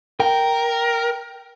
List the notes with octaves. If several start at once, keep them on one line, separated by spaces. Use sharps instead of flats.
A#4 G5